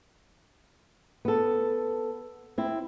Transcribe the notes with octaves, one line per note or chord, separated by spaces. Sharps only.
B3 A4
C4 E4